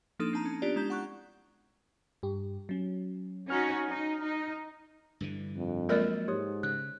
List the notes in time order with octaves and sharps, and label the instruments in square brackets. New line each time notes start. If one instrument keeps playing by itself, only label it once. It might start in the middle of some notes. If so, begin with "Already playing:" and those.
[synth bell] F3 A#3 D4 D#4 A4 D#6
C4 D#4 A5 A#5
C#4
B3 D4 F4 G4 D5
G#3 E4 A#5 G6
F#5 C#6 F#6
[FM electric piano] G2 G4
F#3 C#4
[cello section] C#4 D#4 F#4 [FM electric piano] F6
[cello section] D#4
D#4
[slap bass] G2 D3 E3
[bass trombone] F2
[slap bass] F3 F#3 [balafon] G#3 A#4 D5 [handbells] A#3 F6 A6
[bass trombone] G#2 [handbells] G4 C#5 D#6
[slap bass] C#3 [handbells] F#6